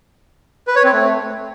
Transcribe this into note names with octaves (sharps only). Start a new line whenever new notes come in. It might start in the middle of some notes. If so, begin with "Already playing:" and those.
B4
C#5
C4
A3